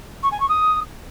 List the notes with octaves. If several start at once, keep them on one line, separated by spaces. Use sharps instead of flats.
C#6
G#5
C#6
D#6